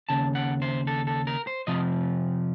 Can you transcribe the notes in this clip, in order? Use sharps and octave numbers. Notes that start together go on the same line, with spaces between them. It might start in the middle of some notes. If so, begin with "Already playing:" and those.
D#2 C#3 A5
F#5
C5
A4
A4
A#4
C5
F2 C3 F3 C4 D#5